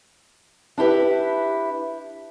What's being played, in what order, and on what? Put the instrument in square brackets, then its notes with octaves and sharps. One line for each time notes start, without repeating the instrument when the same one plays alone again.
[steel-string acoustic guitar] D4 E4 G4 B4 E5